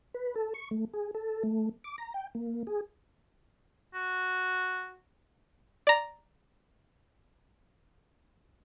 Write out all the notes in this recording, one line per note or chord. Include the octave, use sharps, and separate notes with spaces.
B4
A4
C#6
A3
G#4
A4
A3
D6
A#5
G5
A#3
G#4
F#4
D5 A#5